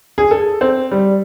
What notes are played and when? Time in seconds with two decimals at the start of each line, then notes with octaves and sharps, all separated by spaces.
0.18 G#4
0.31 A4
0.61 C4
0.91 G3